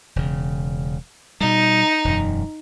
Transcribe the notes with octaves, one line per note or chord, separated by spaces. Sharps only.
E1 C#3
B2 G3 D#4
E1 F#2